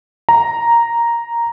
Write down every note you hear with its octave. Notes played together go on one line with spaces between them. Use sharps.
A#5